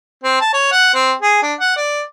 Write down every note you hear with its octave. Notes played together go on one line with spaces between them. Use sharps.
C4
A5
C#5
F#5
C4
G#4
D4
F#5
D5